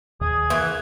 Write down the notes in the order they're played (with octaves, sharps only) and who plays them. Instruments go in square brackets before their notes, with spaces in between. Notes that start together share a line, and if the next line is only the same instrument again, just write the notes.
[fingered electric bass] D#2 [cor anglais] G#4
[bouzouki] E3 [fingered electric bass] A#3